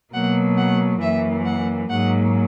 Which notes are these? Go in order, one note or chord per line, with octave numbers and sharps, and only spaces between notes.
B2 F#3 A#3 F#5
F#5
F#2 E3 A#3 E5
F#5
G#2 F#3 A#3 F#5